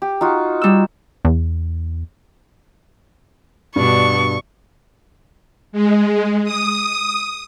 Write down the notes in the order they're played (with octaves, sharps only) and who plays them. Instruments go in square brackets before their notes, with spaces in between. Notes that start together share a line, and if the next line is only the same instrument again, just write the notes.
[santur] G4
D#4 F4 F#4
[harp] G3 E6
[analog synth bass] E2
[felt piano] G2 [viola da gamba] B2 D4 [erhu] C#6
[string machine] G#3
D#6